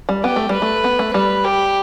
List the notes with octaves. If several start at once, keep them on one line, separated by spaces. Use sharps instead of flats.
G3
B3 G4
A3
G3 B4
A3
B3
A3
G3 B4
G4